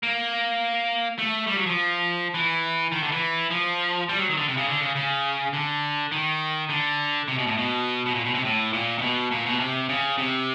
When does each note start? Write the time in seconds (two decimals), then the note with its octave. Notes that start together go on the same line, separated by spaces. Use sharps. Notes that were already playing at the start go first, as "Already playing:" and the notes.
0.03 A#3
1.18 A3
1.47 G3
1.57 F#3
1.66 F3
2.34 E3
2.92 D#3
3.03 D3
3.12 E3
3.51 F3
4.09 G3
4.18 F#3
4.30 D#3
4.37 D3
4.48 C3
4.57 C#3
4.67 D3
4.81 C#3
4.96 C#3
5.53 D3
6.12 D#3
6.69 D3
7.28 C3
7.38 B2
7.47 A2
7.57 B2
8.06 B2
8.14 A#2
8.24 B2
8.34 C3
8.45 A2
8.73 A#2
8.98 C3
9.01 B2
9.31 A#2
9.46 B2
9.60 C3
9.89 C#3
10.18 C3